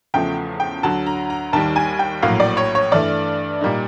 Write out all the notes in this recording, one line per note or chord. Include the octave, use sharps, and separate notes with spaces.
E2 C#3 F3 A3 G5
G5
D2 D3 F#3 A5
A#5
A#5
D#2 D#3 G3 A5
G#5
G5
A#1 A2 F#3 A#3 F5
D5
C#5
C#5
G2 E3 A3 D5
A#2 G3 A#3 D#4